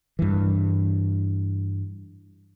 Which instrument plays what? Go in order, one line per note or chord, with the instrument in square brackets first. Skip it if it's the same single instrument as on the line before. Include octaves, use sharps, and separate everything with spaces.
[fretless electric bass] G2 E3